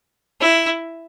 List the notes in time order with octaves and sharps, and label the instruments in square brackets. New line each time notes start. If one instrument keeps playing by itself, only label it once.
[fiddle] E4